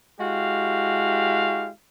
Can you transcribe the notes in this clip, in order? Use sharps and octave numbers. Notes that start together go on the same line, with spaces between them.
G#3 E4 F#4 G4 F5